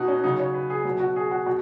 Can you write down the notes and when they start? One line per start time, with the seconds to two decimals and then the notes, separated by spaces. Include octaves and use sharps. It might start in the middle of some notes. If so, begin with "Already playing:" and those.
Already playing: B2 D#4 F#4
0.08 C#4
0.24 C#3 F#3 D#4
0.39 C#5
0.54 B4
0.70 G#4
0.85 B2 F#3
1.00 F#4
1.16 G#4
1.31 F#4
1.46 B2 F#4